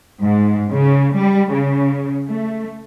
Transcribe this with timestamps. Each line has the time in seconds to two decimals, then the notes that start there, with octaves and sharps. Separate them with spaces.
0.23 G#2
0.71 C#3
1.15 G3
1.52 C#3
2.30 A3